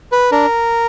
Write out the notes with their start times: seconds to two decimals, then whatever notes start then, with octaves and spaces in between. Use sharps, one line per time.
0.12 B4
0.32 D4 A#4